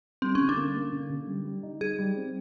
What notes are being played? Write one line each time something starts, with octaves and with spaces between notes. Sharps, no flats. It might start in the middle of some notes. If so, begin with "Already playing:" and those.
G3 C4
C#4
D3
D4
A#3
A#3
D3
D3
G3
G3
D#4
D#4 G#4
G3
C4